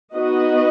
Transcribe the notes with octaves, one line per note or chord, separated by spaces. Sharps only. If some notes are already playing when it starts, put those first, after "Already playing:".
B3 D#4 F#4 B4 D#5